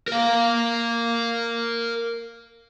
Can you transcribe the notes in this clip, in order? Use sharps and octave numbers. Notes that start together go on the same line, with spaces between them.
A#4 F5